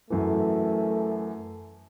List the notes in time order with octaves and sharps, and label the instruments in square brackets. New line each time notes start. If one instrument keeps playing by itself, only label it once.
[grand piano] F#2 E3 [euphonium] A3